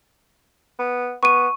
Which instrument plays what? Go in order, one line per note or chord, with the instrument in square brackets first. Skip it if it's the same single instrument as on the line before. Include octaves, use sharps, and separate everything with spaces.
[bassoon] B3
[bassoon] B3 [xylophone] C#6 D#7